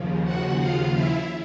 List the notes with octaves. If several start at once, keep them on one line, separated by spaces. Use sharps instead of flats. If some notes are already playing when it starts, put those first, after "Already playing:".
Already playing: D#2 C#3 F3
F#4 F#5
F4 F5
E4 E5